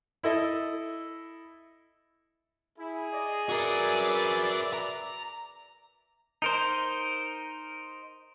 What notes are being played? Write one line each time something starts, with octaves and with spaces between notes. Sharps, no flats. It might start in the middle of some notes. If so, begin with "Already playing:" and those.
E4 A4 D#5
E4 G#4
D5 D#5
F#4 A#4 B4 D5 E5
A#5
D#4 A#4 C5